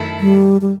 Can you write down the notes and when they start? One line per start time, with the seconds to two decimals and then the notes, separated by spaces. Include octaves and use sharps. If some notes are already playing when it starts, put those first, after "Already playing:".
Already playing: F#2 D#3 A3 E4 A4
0.20 G3
0.61 G3